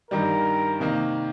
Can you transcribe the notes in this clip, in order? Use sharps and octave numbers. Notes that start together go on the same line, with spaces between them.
G2 D#3 G3 A#4
C3 D#3 A#3